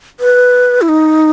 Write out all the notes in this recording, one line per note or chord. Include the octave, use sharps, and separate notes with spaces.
B4
E4
D#4